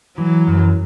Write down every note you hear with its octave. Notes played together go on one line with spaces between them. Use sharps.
E3 F#3
F#2